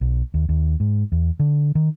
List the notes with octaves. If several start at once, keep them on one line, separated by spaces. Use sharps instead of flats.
B1
D#2
D#2
G#2
E2
D3
D#3